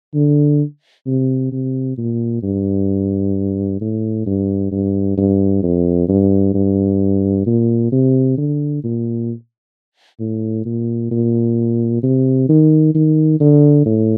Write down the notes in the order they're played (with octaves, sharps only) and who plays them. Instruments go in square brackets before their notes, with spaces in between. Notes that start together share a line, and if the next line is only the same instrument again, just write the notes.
[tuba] D3
C3
C3
A#2
G2
A2
G2
G2
G2
F2
G2
G2
A#2
C3
D3
A#2
A2
A#2
A#2
C3
D#3
D#3
D3
A2